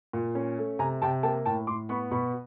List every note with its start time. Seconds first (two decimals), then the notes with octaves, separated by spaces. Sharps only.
0.13 A#2
0.35 C#4
0.58 A3
0.79 C3 G#5 A#5
1.02 C3 G5 A5
1.23 A#3 G5 A5
1.45 A2 G5 A5
1.67 A2 C6 D6
1.89 B3 B5 C#6
2.11 B2 B5 C#6